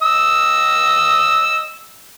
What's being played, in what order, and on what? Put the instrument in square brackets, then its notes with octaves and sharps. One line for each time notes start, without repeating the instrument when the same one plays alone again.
[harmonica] D#5 E6